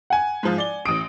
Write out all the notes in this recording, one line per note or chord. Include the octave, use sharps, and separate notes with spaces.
F#5 G#5
G#2 F3
D5 G7
A1 D#6 D7